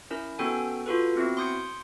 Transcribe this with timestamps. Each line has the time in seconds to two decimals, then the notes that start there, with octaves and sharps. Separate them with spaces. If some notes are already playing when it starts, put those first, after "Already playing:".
0.11 C#4 E4 A#4
0.39 B3 C#4 F#4 A4 G5 G#5
0.86 F4 F#4 A4 B4
1.15 B3 C4 E4 F#4
1.37 C6 D6 D#6 G6 G#6 C#7